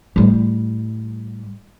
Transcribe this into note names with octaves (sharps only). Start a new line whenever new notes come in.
A2 G3